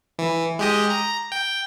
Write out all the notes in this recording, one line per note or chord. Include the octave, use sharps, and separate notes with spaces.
E3
G#3 G4 D#5
A#5
G5